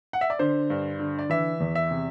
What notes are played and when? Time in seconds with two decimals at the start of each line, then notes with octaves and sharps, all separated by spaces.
0.13 F#5
0.21 E5
0.30 D5
0.39 D3 C5
0.70 G2
1.00 D3
1.19 D5
1.30 E3 E5
1.60 E2
1.75 E5
1.91 C3